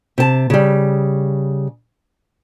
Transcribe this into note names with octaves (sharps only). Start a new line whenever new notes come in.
C3 A5
C#3 G3